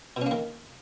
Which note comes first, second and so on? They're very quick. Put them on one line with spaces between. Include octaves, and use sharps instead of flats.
B2 C#4 A#3 D#3